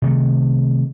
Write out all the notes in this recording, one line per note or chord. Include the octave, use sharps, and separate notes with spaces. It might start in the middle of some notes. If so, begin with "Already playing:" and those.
C3 D#3 A3